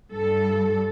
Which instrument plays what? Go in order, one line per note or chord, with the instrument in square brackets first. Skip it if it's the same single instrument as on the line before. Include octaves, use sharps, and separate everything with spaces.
[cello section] G2 A4